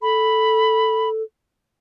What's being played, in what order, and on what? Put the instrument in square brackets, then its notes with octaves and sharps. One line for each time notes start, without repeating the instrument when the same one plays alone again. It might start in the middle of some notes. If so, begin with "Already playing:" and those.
[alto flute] A4 [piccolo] B5